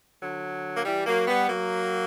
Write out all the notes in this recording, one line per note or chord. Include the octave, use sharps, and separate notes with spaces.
D3 F#3
A#3
E3 G3
F#3 A#3
G3 B3
F#3 A#3